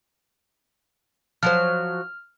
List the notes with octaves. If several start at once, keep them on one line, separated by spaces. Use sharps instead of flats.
F3 F#3 C5 F6